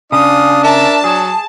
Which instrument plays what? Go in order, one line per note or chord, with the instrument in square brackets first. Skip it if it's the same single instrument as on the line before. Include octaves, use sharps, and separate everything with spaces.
[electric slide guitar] C#3 [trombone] D4 [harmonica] F5 D#6
[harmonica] A#4 E5 [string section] A5
[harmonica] F#3 [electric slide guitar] G#4